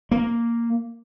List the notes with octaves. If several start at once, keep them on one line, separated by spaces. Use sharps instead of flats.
A#3